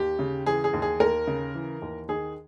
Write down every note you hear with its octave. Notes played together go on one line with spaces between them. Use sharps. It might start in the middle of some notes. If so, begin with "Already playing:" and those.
Already playing: D#2 G4
C#3
E3 G#4
G#4
D#2
G#4
D#2 A#4
C#3
E3
D#2
D#3 G#4